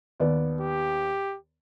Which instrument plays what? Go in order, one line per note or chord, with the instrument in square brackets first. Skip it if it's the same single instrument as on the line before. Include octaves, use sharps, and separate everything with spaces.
[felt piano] D#2 B3 D5
[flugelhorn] G4